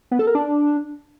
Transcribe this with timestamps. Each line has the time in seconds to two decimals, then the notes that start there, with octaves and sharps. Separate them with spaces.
0.11 B3
0.19 A4
0.27 A#4
0.35 D4